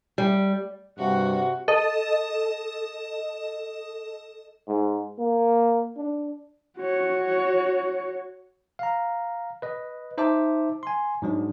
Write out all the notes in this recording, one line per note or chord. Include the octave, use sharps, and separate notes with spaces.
G3
G2 C3 F#4 F#5
A4 D#5
G#2
A#3
D4
F#4 C#5
F5 A#5
B4 D#5
D#4 C5 E5 A5 D6
G#5 C6
G#2 F#3 D4